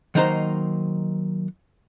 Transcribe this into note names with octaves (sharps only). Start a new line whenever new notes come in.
D#3 F#3 A#3 D#4 C5 A#5